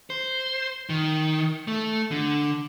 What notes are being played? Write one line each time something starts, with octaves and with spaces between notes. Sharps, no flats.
C5
D#3
A3
D3